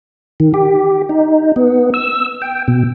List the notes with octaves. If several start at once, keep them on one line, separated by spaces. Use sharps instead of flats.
D#3
G4
D#4
B3
E6
G5
B2